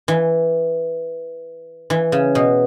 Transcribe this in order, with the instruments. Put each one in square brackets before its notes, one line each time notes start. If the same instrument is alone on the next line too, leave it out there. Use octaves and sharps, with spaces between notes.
[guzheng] E3
E3
C#3
B2